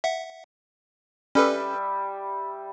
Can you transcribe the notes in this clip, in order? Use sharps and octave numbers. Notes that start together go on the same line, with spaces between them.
E5 F#5
G3 C#4 A4 B4 E5